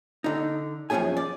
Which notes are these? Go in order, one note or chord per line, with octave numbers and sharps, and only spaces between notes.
D3 D#4
F#2 F3 C#4 D4 G#4 G#5
D5